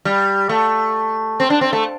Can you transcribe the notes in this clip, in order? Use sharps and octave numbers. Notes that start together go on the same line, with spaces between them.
G3
A3
C4
D4
C4
A3